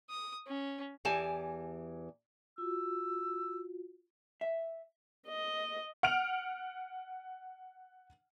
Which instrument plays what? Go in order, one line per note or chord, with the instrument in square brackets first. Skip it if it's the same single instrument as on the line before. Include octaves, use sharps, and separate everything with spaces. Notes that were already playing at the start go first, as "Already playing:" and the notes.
[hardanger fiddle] D#6
C#4
[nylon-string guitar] E2 E3 G4 G#5 A5
[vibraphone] F4 F#4 [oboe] E6
[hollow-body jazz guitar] E5
[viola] D#5
[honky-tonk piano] F#5 F6 D7 F7